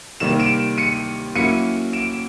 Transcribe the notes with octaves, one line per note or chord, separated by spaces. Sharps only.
C3 D#3 G3 A#3 E7
D7 E7
C#7 D#7
F#3 A#3 C#4 E4 C#7 D#7
D7 E7